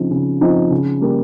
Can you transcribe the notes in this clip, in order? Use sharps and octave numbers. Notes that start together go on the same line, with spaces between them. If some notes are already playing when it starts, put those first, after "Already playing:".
Already playing: C#3 F3 C4 D#4
C#3
F3 C4 D#4
C#3
G3 A#3